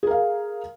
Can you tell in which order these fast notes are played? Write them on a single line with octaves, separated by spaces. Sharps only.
G#4 A#4 F5